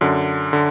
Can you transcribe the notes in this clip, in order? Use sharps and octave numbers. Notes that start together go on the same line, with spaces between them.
F#2 D3
D3